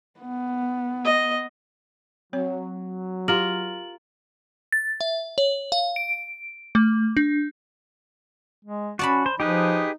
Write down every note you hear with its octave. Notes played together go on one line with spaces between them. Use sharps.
B3
D#5
F#3 C4 C#5
F4 G4 A#4 F#7
A6
E5
C#5
F5
D7
A3
D4
G#3
C#4 F#4 D5 A5 B5
C5
F3 D#4 G4 G#4 B4